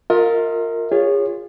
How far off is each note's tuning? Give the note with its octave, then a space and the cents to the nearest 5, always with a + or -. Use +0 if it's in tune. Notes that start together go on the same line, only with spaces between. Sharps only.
F4 +20 A#4 -15 D#5 +45
F4 +0 G#4 -35 C#5 +0